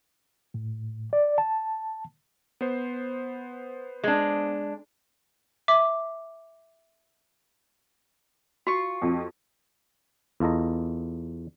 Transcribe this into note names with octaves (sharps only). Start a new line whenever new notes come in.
A2
D5
A5
B3 C5
G#3 D4
E5 D6
F4 F#4 C#6
F2
E2 F4 A4 D#5 A#5